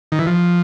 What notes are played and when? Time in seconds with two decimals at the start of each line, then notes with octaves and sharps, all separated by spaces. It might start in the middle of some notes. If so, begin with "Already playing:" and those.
0.12 D#3
0.19 E3
0.26 F3